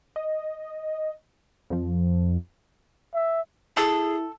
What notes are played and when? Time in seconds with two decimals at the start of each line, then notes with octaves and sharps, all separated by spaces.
0.16 D#5
1.70 F2 F3
3.14 E5
3.77 E4 G#4 A4